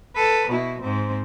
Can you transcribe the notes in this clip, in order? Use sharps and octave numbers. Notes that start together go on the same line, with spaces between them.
A4 B4
B2 E4
G#2 C4